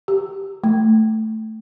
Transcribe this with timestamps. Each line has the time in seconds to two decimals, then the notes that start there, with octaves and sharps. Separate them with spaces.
0.08 G4
0.64 A3